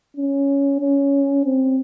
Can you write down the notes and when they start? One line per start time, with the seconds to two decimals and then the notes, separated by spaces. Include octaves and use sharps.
0.17 C#4
0.81 C#4
1.45 C4